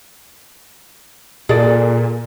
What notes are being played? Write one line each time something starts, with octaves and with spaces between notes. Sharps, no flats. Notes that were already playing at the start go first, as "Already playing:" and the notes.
A#2 G#4 A4 D5